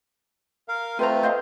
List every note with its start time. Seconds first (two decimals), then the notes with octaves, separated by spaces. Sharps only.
0.68 A#4 F5
0.99 A3 C4 F4 B4 C5 A#5
1.23 C5 D#5 F5